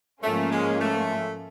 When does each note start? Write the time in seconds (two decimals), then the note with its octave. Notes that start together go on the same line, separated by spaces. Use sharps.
0.23 G#2 F3 A3 A#3 C#4 F4
0.52 G#3
0.81 A3